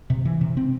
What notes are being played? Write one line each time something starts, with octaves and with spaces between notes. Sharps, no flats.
C3
E3
C3
C4